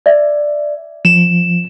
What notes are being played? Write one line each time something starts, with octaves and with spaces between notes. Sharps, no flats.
D5 E5
F3 E7